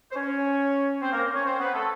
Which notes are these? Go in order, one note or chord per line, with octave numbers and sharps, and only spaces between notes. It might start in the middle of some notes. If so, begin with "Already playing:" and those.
C5
C#4 C#5
C4 C5
A#3 A#4
C#4 C#5
C4 C5
B3 B4
A3 A4